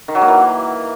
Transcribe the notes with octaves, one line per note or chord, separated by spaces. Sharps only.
D#3
F#3
A#3
E3